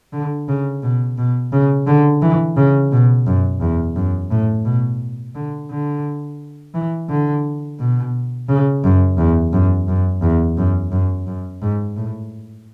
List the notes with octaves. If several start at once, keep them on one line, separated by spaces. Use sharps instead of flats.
D3
C#3
B2
B2
C#3
D3
E3
C#3
B2
F#2
E2
F#2
A2
B2
D3
D3
E3
D3
B2
C#3
F#2
E2
F#2
F#2
E2
F#2
F#2
F#2
G#2
A2